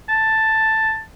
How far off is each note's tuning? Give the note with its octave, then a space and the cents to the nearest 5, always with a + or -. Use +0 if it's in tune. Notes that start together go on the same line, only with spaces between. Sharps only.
A5 +5